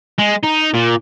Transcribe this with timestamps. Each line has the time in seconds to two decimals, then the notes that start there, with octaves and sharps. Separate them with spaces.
0.19 G#3
0.44 D#4
0.74 A#2